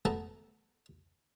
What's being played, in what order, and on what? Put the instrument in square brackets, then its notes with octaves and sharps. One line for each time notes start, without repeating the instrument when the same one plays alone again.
[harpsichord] A3 B3 A4 A5 A#5